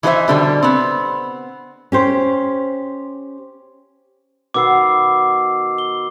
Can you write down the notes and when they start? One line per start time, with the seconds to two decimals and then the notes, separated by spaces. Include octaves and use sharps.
0.03 E3 D#4 G#4 A4 C5 E5
0.28 B2 D3 G3
0.62 B3 C4
1.92 C#4 G4 C5
4.54 B2 D#3 B3 D6 E6 C7
5.78 G7